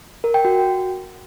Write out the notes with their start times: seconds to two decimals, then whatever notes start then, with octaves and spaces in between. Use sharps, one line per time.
0.24 A#4
0.34 G5
0.45 F#4